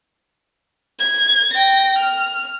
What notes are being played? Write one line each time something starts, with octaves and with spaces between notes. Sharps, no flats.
G#6
G5 A#6
F6